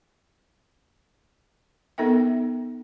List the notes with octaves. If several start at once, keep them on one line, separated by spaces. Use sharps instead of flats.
B3 D#4 A4 A#4 E5 G5